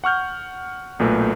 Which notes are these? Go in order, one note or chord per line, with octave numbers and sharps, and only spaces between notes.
F#5 C#6 F6 G6
B1 A#2 A3 B4